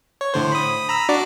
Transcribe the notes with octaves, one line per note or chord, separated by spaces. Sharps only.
C#5
A2 D3 C5
B5 D#6
A#5 B5 E6
D4 F#4 D5